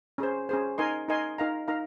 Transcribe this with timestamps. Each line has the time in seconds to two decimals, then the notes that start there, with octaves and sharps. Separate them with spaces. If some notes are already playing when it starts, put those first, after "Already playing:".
0.18 C#4 G#4 C5
0.49 C#4 G#4 C5
0.78 D#4 A#4 D#5 G#5 C6
1.08 D#4 A#4 D#5 G#5 C6
1.38 D#4 A#4 F5 A#5
1.68 D#4 A#4 F5 A#5